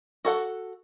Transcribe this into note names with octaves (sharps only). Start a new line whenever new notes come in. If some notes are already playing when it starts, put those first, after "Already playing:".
F#4 A4 F#5